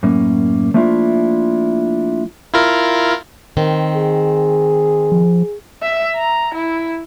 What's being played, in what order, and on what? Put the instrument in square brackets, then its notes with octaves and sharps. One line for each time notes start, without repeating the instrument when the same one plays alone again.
[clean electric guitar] F#2 A2 A#3 C#4
F3 A3 A#3 D4 E4 F4
[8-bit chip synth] E4 F4 A#4
[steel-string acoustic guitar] D#3 C4
[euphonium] G#4
[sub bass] F3
[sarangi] E5
A#5
E4